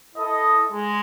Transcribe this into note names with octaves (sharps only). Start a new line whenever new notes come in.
E4 A4 D#5
G#3